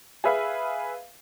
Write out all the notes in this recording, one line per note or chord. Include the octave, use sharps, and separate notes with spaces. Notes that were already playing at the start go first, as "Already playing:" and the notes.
G#4 B4 E5 F5